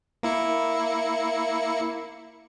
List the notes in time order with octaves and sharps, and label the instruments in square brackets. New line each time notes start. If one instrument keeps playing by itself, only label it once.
[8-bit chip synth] A#3 E4 C#7